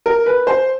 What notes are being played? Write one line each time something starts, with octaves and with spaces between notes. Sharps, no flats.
A#4
B4
C5